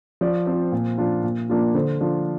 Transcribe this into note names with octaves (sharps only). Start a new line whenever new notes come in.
F3 D5
C4 F4 C5
A#2
F3 D4 F4
A#2
F3 A#3 D4 F4
D3 C5
F3 D4 F4